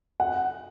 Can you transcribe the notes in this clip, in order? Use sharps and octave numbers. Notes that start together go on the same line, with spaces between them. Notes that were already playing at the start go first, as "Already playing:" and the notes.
F#5